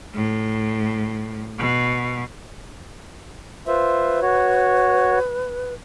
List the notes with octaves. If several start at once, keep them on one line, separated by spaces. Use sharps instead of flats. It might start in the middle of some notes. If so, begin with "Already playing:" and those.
A2
B2
F4 B4 C5 E5
F#4 C#5